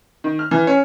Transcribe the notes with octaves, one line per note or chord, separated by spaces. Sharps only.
D#3
F6
E3
C#4